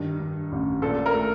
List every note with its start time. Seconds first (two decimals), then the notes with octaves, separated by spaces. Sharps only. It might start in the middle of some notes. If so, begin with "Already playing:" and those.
Already playing: G2 D#3
0.20 G2
0.51 A1
0.82 A#2 A4
1.06 A#4
1.13 A3